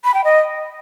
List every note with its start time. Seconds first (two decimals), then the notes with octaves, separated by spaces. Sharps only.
0.04 B5
0.14 G5
0.24 D#5